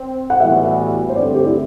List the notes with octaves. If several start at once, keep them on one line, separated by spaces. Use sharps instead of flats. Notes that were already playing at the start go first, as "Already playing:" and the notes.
Already playing: C4
F#5
A2 E3 G3 B3 F#4 E5
C5
G2 D3 A3 C4 D5
G4
E4